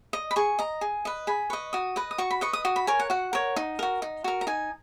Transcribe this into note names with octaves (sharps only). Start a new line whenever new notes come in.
D#5
B5
G#4 C#6
D#5 A#5
G#4
B4 D#5
G#4 B5
B4 D#5 C#6
F#4 D#6
B4 D#5
D#6
F#4 C#6
B5
B4 D#5 C#6
D#6
F#4 D#6
B5
A#4 C#5 G#5
F#5
F#4 F#5
A#4 C#5
D#4
F#4 A#4
D#4
F#4 A#4
A#5
D#4 G#5